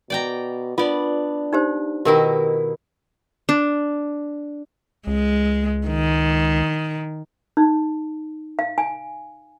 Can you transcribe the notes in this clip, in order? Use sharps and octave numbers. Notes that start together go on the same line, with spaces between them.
B2 D5 G5 A#5
B3 D4 F4 D5
D#4 G4 C5
B2 D#3 E4 G4 A#4
D4
C#2 G#3
D#3
D#4
F5
G#5